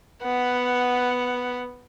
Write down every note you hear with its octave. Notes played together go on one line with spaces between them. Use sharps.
B3 F#5